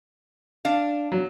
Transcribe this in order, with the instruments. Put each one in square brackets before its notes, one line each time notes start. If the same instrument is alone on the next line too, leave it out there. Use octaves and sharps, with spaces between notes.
[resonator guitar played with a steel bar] D4 F5
[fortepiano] F#3